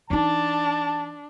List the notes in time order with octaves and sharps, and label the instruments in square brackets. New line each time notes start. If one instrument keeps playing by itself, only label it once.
[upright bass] E3 D#4 [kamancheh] D4 [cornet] A5